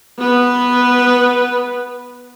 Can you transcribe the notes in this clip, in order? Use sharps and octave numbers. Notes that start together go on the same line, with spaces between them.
B3 B4